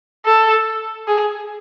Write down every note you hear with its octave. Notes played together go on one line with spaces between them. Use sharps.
A4
G#4